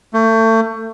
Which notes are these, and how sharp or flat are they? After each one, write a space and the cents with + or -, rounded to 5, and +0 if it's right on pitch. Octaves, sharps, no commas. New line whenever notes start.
A3 +30